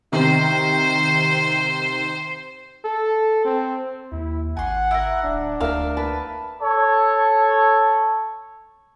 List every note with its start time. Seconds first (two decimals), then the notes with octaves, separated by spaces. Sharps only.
0.12 C3 D#3 C5
2.85 A4
3.45 C4
4.12 D#2 E4
4.57 G#1 F#5 G#5 C6
4.91 E4 A#4
5.23 D1 D4
5.60 D2 A#4 E5 F5 E6 F6
5.97 B4 A5
6.61 A4 C#5 A5